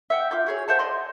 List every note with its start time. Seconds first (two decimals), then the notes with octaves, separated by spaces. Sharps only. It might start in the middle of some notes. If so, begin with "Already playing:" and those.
0.10 E5 F#5 G5
0.31 F4 D6 G6
0.46 F#4 G#4 C#5
0.68 C5 E5 F#5 A5
0.79 D5 D#5 C6